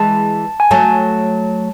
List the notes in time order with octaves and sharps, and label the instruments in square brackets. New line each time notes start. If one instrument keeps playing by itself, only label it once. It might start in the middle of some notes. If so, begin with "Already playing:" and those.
Already playing: [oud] E3 G#3 [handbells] A5
[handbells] G#5
[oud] F#3 A3 [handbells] A5